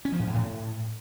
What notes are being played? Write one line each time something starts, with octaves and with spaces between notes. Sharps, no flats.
C#4
F3
A2
G#2
A2